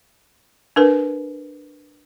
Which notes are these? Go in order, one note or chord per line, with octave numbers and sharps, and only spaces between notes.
D4 A#4 B4